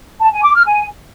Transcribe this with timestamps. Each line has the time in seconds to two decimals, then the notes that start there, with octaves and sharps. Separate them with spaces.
0.20 A5
0.32 G#5
0.43 D6
0.55 F6
0.66 G#5